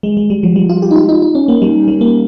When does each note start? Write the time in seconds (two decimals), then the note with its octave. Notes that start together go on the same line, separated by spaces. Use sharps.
0.03 G#3
0.17 G#3
0.30 G3
0.43 F3
0.56 G3
0.69 F4
0.82 G4
0.91 D#4
0.96 F4
1.09 D#4
1.22 D#4
1.35 C#4
1.48 A#3
1.62 G3
1.88 G3
2.01 A#3